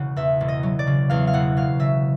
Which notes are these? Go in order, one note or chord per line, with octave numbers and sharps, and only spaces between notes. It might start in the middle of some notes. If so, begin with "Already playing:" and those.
Already playing: E1 C#3 F#5
E2 E5
E1
D#5
F#3
D5
C#3
E2 F5
F5
E1 F#5
F#3 F5
C#3 E5